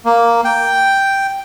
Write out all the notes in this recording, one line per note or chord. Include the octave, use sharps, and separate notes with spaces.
A#3
G5